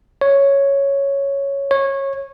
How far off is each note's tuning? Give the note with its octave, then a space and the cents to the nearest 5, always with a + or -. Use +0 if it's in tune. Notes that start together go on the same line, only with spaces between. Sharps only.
C#5 +0
C#5 -20